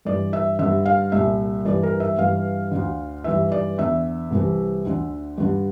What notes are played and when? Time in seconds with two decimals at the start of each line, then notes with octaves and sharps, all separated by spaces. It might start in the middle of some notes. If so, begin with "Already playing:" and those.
0.05 G2 E3 D5
0.33 E5
0.59 G2 D3 E5
0.86 F5
1.12 C2 A#2 E5
1.65 G2 E3 D5
1.83 A#4
2.00 E5
2.18 G2 E3 F5
2.71 D2 D3
3.24 G2 E3 E5
3.52 D5
3.78 E2 D3 E5
4.31 C2 C3 E3
4.85 D2 D3
5.38 G2 D3